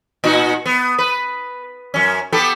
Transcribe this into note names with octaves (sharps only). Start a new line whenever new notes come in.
A#2 D#4 F#4
B3
B4
F#2 C#4
B3 G4 A4